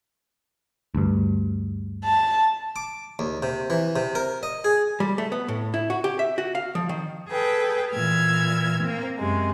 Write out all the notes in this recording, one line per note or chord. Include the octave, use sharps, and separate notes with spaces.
D2 G2
A5
D6
D#2
C3
E3
C3
A#4
D#5
G#4
G3
A3
B3
A2
E4
F#4
G4
E5
F#4
F5
F3
D#3
G#4 A4 B4 G5
A#2 E3 E6 F6 G#6
A#3 C4
F#2 C3 G#3